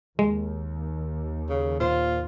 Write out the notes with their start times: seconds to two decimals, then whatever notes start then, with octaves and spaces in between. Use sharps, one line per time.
0.19 D#2 G#3
1.50 C#3
1.80 A#2 F4 C5